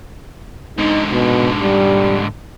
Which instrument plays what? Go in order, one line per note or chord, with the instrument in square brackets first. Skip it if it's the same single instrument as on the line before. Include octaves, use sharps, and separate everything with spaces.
[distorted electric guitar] G#2 D3 [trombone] D#4
[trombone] B2
G3